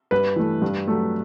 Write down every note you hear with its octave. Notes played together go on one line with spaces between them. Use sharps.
G2 B4
E3 A3
G2
F#3 A3